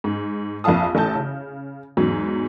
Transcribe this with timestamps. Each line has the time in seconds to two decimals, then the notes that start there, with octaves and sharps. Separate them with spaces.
0.04 G#2
0.64 A#1 F2 E5 F5 A5 D#6
0.95 A1 A2 A4 A5 G6
1.15 C#3
1.97 E2 G#2 F#3